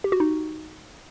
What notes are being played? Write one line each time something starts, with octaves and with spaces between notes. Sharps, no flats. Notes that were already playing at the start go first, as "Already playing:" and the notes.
G4
F#4
D#4